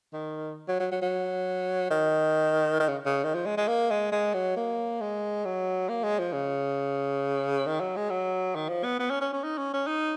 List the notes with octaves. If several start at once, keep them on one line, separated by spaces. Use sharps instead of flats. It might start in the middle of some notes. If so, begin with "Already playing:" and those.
D#3
F#3
F#3
F#3
F#3
D#3
D#3
C#3
C#3
D#3
F3
G#3
G#3
A#3
G#3
G#3
F#3
A#3
G#3
F#3
A#3
G#3
F3
C#3
D#3
F#3
G#3
F#3
D#3
F3
B3
B3
C#4
C#4
C#4
D#4
C#4
C#4
D#4